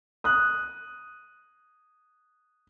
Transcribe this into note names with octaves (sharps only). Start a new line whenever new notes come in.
D#6 F#6